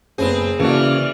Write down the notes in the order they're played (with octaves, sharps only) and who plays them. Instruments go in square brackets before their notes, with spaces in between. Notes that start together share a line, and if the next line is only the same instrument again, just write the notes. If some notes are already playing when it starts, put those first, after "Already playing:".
[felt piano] F#1 B3 E7 [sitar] C4 G#4
[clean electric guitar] C#3 [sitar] E3 [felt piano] A#3 F#4 A4 [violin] D5 F6